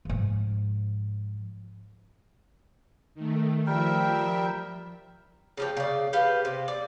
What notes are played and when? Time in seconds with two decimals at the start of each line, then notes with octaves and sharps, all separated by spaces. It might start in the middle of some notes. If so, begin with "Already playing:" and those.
0.05 G#2 F3
3.15 D#3 A3
3.67 F3 G3 A#4 E5 G5
5.57 C#3 F3 G4
5.77 C#3 D5
6.13 G4 B4 F5
6.45 C3
6.68 D5